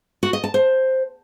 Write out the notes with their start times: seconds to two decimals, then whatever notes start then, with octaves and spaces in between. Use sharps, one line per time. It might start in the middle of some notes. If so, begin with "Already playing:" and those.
0.23 F#4
0.33 D#5
0.44 A5
0.54 C5